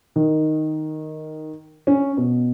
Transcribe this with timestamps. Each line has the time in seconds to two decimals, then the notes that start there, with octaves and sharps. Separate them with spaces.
0.16 D#3
1.87 C#4
2.17 B2